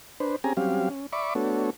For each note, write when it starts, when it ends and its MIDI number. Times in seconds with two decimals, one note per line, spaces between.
0.20 0.36 62
0.20 0.36 71
0.20 0.36 72
0.44 0.53 60
0.44 0.53 61
0.44 0.53 67
0.44 0.53 68
0.44 0.53 80
0.44 0.53 82
0.57 0.89 54
0.57 0.89 55
0.57 0.89 60
0.57 0.89 61
0.57 0.89 67
0.57 0.89 77
0.90 1.06 61
1.13 1.34 74
1.13 1.34 76
1.13 1.34 83
1.13 1.34 85
1.13 1.34 86
1.35 1.70 57
1.35 1.70 59
1.35 1.70 62
1.35 1.70 66
1.35 1.70 69
1.35 1.70 73